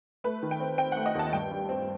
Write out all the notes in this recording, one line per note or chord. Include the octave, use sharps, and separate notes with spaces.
A3 B4
D#3
G5
C4
C4 G5
F#5
A3
D#5
D#2 A5
G2 G5
G3
C4